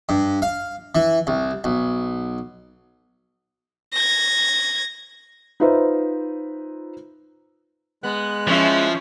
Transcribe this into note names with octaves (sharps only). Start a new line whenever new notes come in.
G2
F5
E3
C2
B1
G#6 A#6
D#4 F4 B4 C5 E5
G#3 B3 F#6
F3 C#4 E4 E5